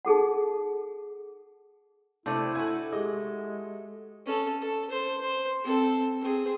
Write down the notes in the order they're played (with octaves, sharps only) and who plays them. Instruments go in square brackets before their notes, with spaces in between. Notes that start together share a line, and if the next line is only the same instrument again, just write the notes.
[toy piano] D#4 G#4 A4 F#5
[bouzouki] C3 [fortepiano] A3 D4 D5 [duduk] E4 [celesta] G6 D#7
[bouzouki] A3 F#4 F#5 [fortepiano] G#5
[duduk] G#3 [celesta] G4 G#4 [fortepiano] D#5
[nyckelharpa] C#4 A4
A4
C5
C5
C4 A4
C4 G#4